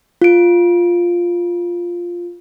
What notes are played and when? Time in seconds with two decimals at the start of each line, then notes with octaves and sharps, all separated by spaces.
0.22 F4 D7